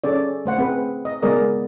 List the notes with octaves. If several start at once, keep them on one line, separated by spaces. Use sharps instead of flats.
C#4 G#4 A4 D5
A3 C5 F#5
C4 G#4 B4
D#5
G#3 B3 G#4 A#4 D5 D#5